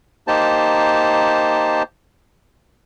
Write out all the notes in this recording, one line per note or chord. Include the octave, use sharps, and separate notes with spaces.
A#3 D#4 G4 C5 A5